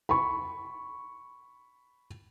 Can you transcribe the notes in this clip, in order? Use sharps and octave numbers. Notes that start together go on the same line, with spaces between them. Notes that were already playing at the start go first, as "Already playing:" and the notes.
B5 C#6